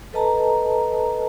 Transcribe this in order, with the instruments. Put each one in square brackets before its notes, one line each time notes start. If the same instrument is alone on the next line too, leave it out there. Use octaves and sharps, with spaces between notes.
[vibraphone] A4 B4 D#5 A5 A#5